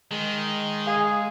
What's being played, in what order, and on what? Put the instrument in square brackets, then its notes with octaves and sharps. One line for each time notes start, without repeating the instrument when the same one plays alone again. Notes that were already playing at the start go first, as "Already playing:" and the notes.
[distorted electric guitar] D#3 [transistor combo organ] G#3
[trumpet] G#4 [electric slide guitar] F5